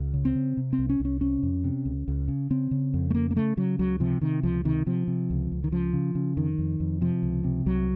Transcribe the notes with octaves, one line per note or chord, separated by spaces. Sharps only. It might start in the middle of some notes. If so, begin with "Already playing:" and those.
Already playing: C#2
C#3
C4
C#3
C3
C4
C2
C#4
C2 C#4
C3 C#4
F2
C3
C#2
C#2
C#3
C#3 C4
C#3
F2
A3
C#3 A#3
A#3
C#3 A3
C#3 F#3
C#2 F#3
C3 F3
C3 D#3
C#2 F3
C3 D#3
C3 F3
C3
C#2
C#2
D#3
C#3 F3
C#3
C#3
F2 D#3
F2
F2
C3 F3
C#2
C3
C2 F#3